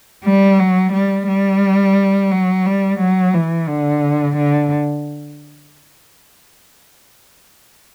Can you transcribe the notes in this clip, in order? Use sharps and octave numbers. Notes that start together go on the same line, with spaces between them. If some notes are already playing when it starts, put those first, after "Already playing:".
G3
F#3
G3
G3
F#3
G3
F#3
E3
D3
D3